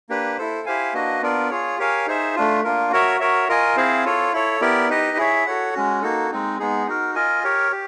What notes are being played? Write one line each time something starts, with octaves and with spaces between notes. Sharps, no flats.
A#3 D4 G4 B4
E4 A4 C5
E4 G4 C5 F5 G#5
A#3 D4 F#4 B4 D#5
B3 D4 F4 A#4 D5
F4 G#4 C#5
G4 A#4 C#5 F5 G#5
D#4 G#4 C5 E5
A3 D4 F4
A#3 D4 F4 A#4
F#4 A#4 C#5 E5
F#4 A#4 C#5 E5
F4 A#4 D#5 G#5
C4 E4 G#4 C5 F5
F4 A4 C#5
E4 A4 C#5
B3 E4 G4 A#4 D5
D#4 G4 B4 D#5
E4 G#4 C#5 E5
F#4 A4 C#5 F#5
G#3 C#4 F#4
A#3 D#4 F#4 A4
G#3 C4 D#4
G#3 B3 D#4 G#4
D#4 F#4 A#4
F4 A#4 D#5 G#5
G4 A#4 C#5
G4